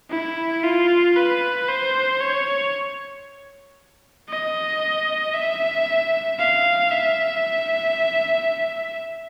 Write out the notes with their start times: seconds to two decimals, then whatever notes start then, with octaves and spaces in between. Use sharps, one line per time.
0.11 E4
0.63 F4
1.16 B4
1.69 C5
2.21 C#5
4.30 D#5
5.35 E5
6.39 F5
6.91 E5